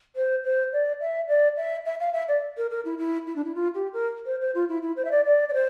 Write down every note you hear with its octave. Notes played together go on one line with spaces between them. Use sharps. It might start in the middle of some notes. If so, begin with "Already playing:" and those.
C5
C5
D5
E5
D5
E5
E5
F5
E5
D5
A#4
A#4
E4
E4
E4
D4
E4
F4
G4
A#4
C5
C5
F4
E4
E4
C5
E5
D5
D5
D5
C5